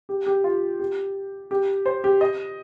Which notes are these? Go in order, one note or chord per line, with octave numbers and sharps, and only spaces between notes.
G4
G4
F4
G4
G4
C5
G4
D#5